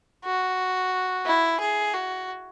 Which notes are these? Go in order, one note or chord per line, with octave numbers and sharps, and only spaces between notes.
F#4
E4
G#4
F#4